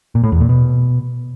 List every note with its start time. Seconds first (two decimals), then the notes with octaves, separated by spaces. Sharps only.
0.15 A#2
0.24 A2
0.32 E2
0.41 A#2
0.49 B2